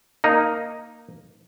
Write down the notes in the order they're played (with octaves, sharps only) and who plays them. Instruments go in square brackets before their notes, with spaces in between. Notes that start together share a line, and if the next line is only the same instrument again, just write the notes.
[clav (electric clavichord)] A#3 D#4